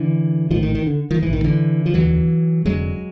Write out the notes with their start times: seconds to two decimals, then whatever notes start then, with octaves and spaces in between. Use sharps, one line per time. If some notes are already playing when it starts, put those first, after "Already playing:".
Already playing: D3 E3
0.50 A#1 A2 D#3 F3
0.62 D#3
0.75 D#3
0.86 D3
1.11 D#3 F3
1.22 A#1 G#2 E3
1.33 D#3
1.44 D3 E3
1.86 F3
1.93 F1 D#2 D3 E3 F#3
2.65 F1 F2 D3 F#3 G#3